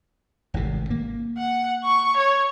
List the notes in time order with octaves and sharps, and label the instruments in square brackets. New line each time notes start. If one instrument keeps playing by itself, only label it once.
[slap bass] G#1 A2 C3
A#3
[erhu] F#5
C#6
C#5